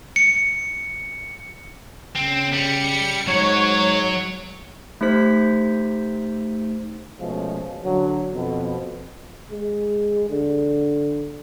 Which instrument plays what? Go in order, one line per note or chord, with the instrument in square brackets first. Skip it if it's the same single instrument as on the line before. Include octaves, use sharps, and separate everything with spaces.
[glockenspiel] C#7
[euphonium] C#3 [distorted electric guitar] C4
[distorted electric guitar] G3 [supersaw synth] C#7
[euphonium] G#2 [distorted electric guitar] F#3 F#5 [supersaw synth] C#5
[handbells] A3 D#4 G4 C5 B6
[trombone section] B2 F3 G#3 A3 C#4
D3 F#3
F2 B2
[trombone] G#3
D3